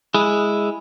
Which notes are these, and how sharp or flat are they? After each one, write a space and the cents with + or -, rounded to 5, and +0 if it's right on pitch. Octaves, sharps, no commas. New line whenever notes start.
G#3 +0 E4 +0 G#4 +0